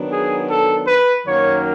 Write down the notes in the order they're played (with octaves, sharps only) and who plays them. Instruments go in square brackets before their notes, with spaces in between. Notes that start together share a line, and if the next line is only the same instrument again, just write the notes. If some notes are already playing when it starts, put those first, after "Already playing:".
Already playing: [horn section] D#3 F#3 B3 D4
G#4
A4
B4
F#2 D#3 F#3 A#3 C#5